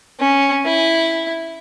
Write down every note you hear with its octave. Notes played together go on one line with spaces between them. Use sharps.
C#4
E4